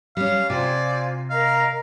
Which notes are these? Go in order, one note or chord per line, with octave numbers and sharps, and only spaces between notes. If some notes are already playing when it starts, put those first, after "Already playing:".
G3 C#4 F5
C3 F4 C5 D5 G#5
A#4 D#5 F5 A#5